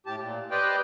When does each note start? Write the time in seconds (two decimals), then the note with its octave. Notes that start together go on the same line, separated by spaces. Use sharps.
0.06 A2 G4 A5
0.20 A#2
0.51 G4 B4 C5 D5 D#5 G5